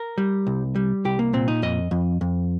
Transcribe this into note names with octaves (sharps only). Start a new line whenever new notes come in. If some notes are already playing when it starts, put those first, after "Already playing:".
Already playing: A#4
G3
C2
G3
C2 G4
A#3
A#2 C4
D#4
F2 D#5
F2
F2